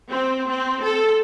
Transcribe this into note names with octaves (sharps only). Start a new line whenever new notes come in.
C4
C4
A4